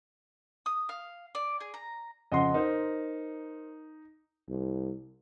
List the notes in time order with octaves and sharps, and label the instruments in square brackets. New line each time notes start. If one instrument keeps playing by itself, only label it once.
[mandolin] D#6
F5
D5
G#4
A#5
[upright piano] F2 C#3 [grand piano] D#5 F#5 C6
[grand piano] D#4 [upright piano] A#4 C5
[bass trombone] C2